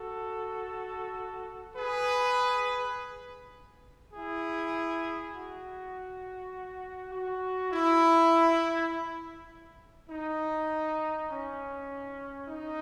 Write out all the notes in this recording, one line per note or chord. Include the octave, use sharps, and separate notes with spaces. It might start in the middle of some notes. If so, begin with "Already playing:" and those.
Already playing: F#4 A4
G#4 B4
E4 G#4
F#4
F#4
E4
D#4
C#4
D#4